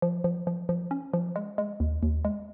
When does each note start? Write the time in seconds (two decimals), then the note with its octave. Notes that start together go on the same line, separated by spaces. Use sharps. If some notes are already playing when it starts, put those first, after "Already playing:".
0.02 F3
0.24 F3
0.47 F3
0.69 F3
0.91 C#4
1.14 F3
1.36 G#3
1.58 G#3
1.80 D#2
2.03 D#2
2.25 G#3